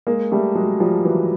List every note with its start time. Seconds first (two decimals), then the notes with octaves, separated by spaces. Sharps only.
0.07 G#3 A#3
0.32 G3 A3
0.55 F#3 G#3
0.80 F3 G3
1.05 E3 F#3